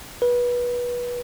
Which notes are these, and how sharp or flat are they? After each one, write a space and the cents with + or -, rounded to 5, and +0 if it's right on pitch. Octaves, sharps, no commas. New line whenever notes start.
B4 -25